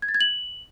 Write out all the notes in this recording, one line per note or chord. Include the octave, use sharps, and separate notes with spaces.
G#6
A6
G#6
F#7